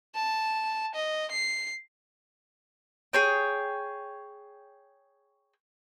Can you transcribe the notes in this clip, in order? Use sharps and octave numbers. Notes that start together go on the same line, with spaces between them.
A5
D#5
C7
G#4 C#5 G5